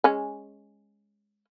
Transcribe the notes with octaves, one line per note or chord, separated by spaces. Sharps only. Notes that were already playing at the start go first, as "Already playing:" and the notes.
G#3 C#4